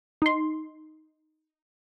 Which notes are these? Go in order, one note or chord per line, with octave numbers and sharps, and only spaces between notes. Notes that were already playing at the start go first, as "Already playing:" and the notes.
D#4 C6